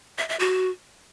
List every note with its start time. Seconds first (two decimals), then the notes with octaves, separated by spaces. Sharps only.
0.18 E5
0.29 E5
0.40 F#4